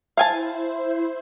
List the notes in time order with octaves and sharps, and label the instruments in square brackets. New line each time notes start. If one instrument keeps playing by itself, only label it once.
[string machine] E4 C5 [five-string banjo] F5 G#5 A5